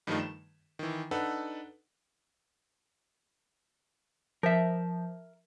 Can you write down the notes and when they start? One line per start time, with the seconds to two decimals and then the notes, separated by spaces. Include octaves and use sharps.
0.07 G2 D#3 F3 G3 A3 D#4
0.19 E7
0.79 D#3 E3
1.11 D4 D#4 A4 B4 F#5
4.43 F3 A#4 E5